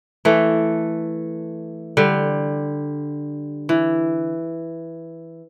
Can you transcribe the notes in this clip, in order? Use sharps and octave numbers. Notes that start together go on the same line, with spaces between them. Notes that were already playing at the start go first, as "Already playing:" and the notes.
E3 A3
D3 G3
E3